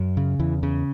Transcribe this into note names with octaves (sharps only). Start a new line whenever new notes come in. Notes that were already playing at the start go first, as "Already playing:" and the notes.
Already playing: F#2
C#3
E2 E3
C#3